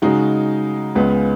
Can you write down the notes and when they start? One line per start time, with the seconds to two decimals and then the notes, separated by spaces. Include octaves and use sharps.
0.02 C#3 G#3 D#4 F#4
0.95 C#2 C#3 G#3 B3